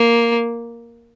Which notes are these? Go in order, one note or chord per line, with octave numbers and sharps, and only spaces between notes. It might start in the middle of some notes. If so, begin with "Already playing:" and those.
Already playing: A#3